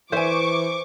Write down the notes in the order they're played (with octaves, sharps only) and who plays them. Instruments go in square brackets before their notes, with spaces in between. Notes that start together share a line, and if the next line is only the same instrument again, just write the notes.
[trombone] E3 [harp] C5 [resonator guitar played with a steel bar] E5 G#5 [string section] C#6 D6